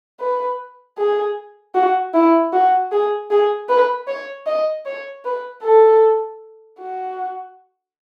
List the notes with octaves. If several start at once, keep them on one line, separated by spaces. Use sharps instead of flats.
B4
G#4
F#4
E4
F#4
G#4
G#4
B4
C#5
D#5
C#5
B4
A4
F#4